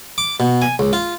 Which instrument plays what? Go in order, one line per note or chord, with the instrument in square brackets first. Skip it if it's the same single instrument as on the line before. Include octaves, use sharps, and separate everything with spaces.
[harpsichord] D6
B2
G#5
C#2
F4